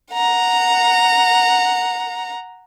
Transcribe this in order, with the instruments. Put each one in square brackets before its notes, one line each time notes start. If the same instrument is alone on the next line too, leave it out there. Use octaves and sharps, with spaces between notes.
[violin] F#5 A#5